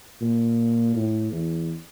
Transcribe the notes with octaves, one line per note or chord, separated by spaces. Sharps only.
A#2
A2
E2